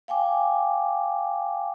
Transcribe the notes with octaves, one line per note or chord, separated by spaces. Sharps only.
F5 G5 G#5 D6